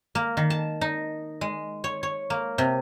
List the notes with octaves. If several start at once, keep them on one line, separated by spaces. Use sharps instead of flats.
A#3
D#3
A5
D#4
G#3
C#5
C#5
A#3
C3